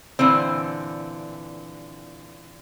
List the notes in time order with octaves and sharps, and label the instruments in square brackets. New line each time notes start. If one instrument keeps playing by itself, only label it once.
[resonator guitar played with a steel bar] A#2 D3 E3 C4